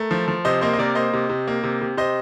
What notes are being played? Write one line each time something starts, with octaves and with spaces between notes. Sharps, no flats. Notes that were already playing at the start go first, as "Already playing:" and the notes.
Already playing: A3 A#4
F3
F3
C3 C5 D#5
A#3 C5 D#5
D#5
C3 A#4 D5
A#3 C5 D#5
C3
C3
A#3
C3
C3
C3 C5 D#5